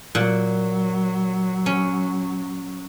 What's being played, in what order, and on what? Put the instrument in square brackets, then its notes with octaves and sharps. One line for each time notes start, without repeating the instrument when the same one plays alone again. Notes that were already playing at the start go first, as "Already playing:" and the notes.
[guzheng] A#2 F#5 [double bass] F#3
[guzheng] C#4